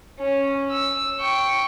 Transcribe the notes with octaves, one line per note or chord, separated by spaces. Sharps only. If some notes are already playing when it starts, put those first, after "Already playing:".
C#4
E6
G5 C#6